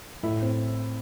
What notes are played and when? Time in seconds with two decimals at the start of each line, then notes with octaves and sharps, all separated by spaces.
0.23 A2 E4
0.42 C4